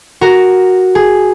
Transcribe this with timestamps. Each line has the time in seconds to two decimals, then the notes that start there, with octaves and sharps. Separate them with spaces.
0.21 F#4 A#4
0.95 G#4